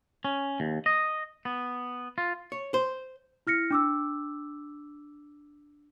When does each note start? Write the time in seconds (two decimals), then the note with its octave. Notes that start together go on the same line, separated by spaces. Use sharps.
0.25 C#4
0.60 D#2
0.86 D#5
1.45 B3
2.18 F4
2.52 C#5
2.74 C5
3.47 E4 F6 A#6 C#7
3.71 D4 D6 E6